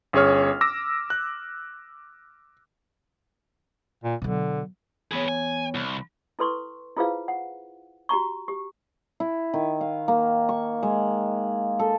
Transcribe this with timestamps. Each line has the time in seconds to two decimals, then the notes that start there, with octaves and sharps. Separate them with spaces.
0.13 G1 C#4 G#4 C#5 F6
0.61 D6 E6 A#6
1.10 F#6
4.04 A#2
4.22 B2 D3 F#3
5.12 E2 B3 G#4 B4 C#5
5.29 G#5
5.75 C2
6.39 E4 A4 B4 C6 C#6
6.97 E4 F4 G#4 B4 C5 F5
7.28 F#5
8.09 F#4 G4 A#5 C#6
8.48 G4
9.20 E4
9.54 D#3
9.81 F5
10.08 A#3
10.49 C#6
10.83 G#3
11.79 A4